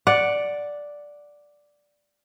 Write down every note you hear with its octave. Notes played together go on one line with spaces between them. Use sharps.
D5 F#5